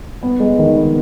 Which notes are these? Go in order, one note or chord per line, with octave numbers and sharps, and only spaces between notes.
B3
G#3
D#3
B3